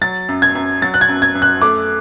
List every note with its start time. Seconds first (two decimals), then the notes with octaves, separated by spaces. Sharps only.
0.01 F#3 A6
0.29 F#2
0.42 G#6
0.55 F#2
0.82 F#3 A6
0.94 F#6
1.01 G#6
1.09 F#2
1.22 G#6
1.35 F#2
1.42 F#6
1.62 A3 D6